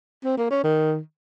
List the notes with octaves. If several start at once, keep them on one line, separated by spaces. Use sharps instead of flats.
C4
A#3
C#4
D#3